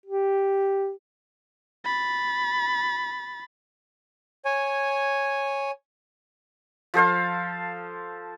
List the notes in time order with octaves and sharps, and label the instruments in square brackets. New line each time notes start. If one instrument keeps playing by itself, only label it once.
[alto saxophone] G4
[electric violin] B5 A6
[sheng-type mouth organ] C#5 G#5
[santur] F3 A4 C5 F5